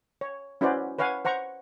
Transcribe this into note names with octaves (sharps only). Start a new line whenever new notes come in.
C#5
C#4 E4 F#4 B4 C5 D5
B4 C#5 F5 F#5 G#5
C5 F#5 A#5 C#6